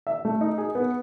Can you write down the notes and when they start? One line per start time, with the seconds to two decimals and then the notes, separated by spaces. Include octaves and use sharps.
0.07 E5
0.25 A3
0.41 D#4
0.58 G#4
0.75 B3